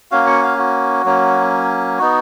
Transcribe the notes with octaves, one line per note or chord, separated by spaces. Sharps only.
A#3 C#4 F#4 F5
F#5
F5
F#4
F#3 A#3 C#4
B3 D#4 F#4